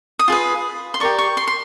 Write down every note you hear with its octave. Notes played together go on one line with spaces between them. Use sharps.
D#6
F4 G#4 B4
C6
G4 A#4 D5 C#6
C#6
C6
C6